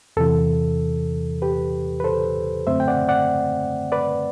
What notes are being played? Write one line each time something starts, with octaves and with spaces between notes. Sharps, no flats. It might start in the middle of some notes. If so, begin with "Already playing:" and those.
E2 C3 E3 A4
G4 B4
B4
A4 C5
F#2 D3 A3 C4 C5 E5
G5
D5 F#5
D5 F#5
B4 D5